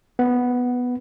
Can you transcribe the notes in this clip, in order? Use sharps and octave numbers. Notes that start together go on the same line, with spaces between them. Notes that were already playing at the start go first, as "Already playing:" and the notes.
B3